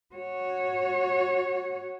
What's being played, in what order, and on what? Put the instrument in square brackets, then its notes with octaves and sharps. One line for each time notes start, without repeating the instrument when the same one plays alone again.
[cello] F#4 C#5